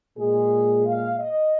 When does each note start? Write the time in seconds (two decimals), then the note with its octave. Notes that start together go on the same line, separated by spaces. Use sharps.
0.18 A#2 G#3 G#4
0.85 F5
1.20 D#5